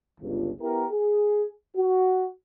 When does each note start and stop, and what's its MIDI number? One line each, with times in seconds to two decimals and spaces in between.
0.21 0.51 31
0.21 0.51 37
0.61 0.85 59
0.61 0.85 64
0.61 0.85 67
0.61 0.85 70
0.91 1.46 68
1.75 2.25 66